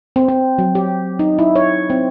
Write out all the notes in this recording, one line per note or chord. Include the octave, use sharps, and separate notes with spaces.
C4
C4
F#3
G4
D#4
E4
C#5
C4